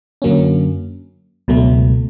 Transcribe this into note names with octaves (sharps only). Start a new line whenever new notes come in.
F#2 D3 F#3 A#3 C#4
C#2 B2 F#3 A3